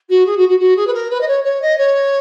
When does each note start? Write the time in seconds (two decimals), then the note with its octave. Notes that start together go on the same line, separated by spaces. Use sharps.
0.09 F#4
0.26 G#4
0.37 F#4
0.48 F#4
0.59 F#4
0.76 G#4
0.87 B4
0.94 A#4
1.10 B4
1.20 D#5
1.27 C#5
1.44 C#5
1.61 D#5
1.78 C#5